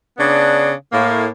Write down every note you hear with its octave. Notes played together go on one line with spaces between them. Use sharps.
C#3 B3 D4
A2 A#3